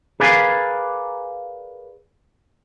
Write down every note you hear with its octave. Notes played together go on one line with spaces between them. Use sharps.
G#4 A#4 B4 D5 F5 G#5